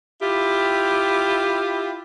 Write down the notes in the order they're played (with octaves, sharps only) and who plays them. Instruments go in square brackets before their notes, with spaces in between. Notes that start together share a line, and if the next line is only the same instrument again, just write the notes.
[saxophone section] E4 F4 G4